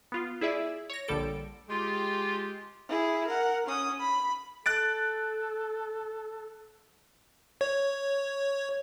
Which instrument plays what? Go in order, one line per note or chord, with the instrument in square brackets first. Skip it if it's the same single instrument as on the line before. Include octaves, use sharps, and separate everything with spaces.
[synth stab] B3 F4
E4 G#4 D5 E5
C#5 A#6
A#1 D3 G3 A4 D7
[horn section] G#3 G4 [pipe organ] F4
[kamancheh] E4 G#4
A#4 F#5
C#4 D#6
B5
[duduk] A4 [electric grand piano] F#6 A6 D7
[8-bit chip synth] C#5